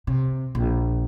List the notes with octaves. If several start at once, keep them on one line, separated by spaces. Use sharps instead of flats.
C3
A#1